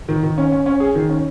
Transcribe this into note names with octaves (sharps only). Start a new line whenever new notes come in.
D#3
D#3
C#4
C#4
C#4
G#4
D#3
C#4